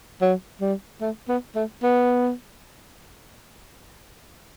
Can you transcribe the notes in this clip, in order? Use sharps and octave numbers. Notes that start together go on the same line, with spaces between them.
F#3
G3
A3
B3
A3
B3